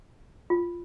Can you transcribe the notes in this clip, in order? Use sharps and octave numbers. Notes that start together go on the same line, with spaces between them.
F4